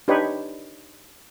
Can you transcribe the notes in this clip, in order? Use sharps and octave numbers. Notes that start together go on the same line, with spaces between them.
D4 D#4 G4 B4 C#5